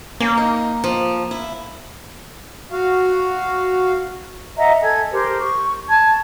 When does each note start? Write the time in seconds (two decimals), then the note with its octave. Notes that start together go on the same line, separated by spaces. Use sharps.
0.20 A#3 C#4
0.37 D#4
0.84 F3
1.31 E4
2.72 F#4 F5
4.58 D#5 E5 F#5 A#5
4.80 A4 G#5 G#6
5.11 G4 A#4 C5
5.39 C#6
5.89 A5 G#6